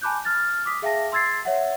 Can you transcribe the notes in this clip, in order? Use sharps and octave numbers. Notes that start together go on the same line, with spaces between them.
G#5 A5 B5 D6 F#6 G6
F6 A6
D6 D#6 B6
G#4 E5 F5 G5 A5 A#6
C6 E6 G#6 A6 C7
C#5 E5 F#5